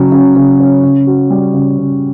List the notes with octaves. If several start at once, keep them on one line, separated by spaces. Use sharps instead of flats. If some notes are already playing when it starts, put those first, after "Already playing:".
Already playing: C#3 F#3 C#4
C#3
C#3
C#4
C#3
F#4
G3
C#3
C#3